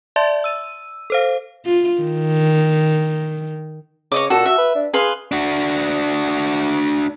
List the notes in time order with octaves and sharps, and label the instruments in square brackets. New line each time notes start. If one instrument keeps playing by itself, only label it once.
[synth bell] D5 E5 A5 C6 A6
E6 D#7
A4 C5 F5
[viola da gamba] F4
D#3
[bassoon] C#3 [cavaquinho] C#5 D#5 D6
[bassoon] A#2 [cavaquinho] F#4 A4
[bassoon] F#4 [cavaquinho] E5
[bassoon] B4
D4
[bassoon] G#4 [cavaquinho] B4 F5 C6
[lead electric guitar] D4 F#4